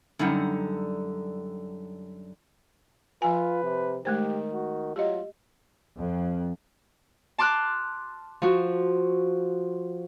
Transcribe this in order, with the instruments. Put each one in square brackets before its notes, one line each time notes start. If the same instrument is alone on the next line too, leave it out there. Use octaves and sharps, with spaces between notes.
[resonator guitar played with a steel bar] F#2 D3 G3 D#4 F#5
[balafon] F3 G#5 [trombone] F4 [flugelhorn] B4
[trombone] C3
[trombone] D#3 [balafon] G#3 A3 C5 [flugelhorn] G4
[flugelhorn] F#4
[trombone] F#3 [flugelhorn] F4 [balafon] G4 D#5
[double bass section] F2
[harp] A5 C6 D6 F6 F#6
F3 F#4